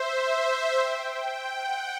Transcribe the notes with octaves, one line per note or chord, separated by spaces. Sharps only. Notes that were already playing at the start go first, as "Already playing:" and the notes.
Already playing: C5 E5
G5
F#5